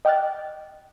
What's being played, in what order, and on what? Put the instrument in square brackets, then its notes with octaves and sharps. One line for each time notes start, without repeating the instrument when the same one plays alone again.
[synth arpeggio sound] D#5 G5 D6 F6 F#6 A6